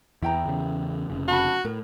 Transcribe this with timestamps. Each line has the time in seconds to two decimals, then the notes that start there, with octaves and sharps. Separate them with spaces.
0.22 E2 E3 E4 G5 A#5
0.46 E2 C#3
1.10 F1 C#3
1.28 F#4 A5 B5
1.65 A2 A#4